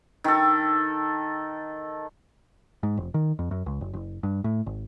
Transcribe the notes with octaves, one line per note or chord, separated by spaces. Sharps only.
D#3 A4
G#2
F1
D#3
F2
F#2
C#2
F#1
F#1
G2
A2
G#1